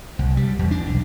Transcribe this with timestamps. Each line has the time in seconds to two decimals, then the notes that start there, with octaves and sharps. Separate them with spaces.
0.19 C2
0.37 G3
0.59 E2
0.71 D4
0.86 B1